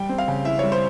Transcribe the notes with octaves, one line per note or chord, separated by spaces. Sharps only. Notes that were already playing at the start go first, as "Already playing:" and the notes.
Already playing: G3 G5
C4
F5
C#3
E4 E5
G3 C#5
C5